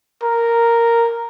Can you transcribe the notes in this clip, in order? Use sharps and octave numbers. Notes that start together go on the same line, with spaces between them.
A#4